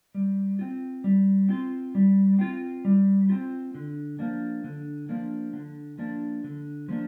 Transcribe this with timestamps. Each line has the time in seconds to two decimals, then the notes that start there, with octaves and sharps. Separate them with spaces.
0.15 G3
0.59 C4 F4
1.04 G3
1.49 C4 F4
1.95 G3
2.39 C4 F4
2.85 G3
3.30 C4 F4
3.75 D3
4.19 F3 A#3 D4
4.64 D3
5.09 F3 A#3 D4
5.53 D3
5.98 F3 A#3 D4
6.44 D3
6.89 F3 A#3 D4